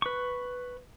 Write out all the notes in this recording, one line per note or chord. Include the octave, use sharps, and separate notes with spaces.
B4 C#6